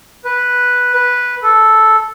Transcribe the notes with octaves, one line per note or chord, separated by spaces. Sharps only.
B4
B4
A4